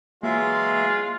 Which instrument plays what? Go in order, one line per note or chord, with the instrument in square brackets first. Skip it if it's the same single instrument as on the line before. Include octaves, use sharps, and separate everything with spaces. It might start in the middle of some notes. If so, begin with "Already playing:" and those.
[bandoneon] E3 F#3 E5 [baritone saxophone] G#3 [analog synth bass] A#3 [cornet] F4